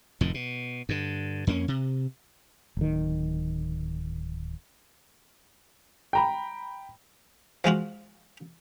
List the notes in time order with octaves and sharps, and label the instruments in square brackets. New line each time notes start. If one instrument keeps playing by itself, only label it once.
[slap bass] F1 F2 A2 D#3
B2
G2 D3
F2 A#3 B3 C#4
C3
[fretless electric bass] D1 D#3
[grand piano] G5 A#5 B5
[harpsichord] F3 G#3 F4 F#4